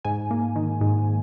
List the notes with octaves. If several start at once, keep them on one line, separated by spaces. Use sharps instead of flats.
G#2 G#5
A#3
D#3
G#2